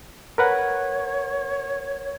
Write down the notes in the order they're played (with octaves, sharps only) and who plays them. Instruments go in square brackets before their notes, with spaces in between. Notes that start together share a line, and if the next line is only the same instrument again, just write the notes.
[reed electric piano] A#4 B4 F#5 [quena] C#5